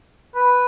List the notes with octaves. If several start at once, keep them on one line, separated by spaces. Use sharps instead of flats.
B4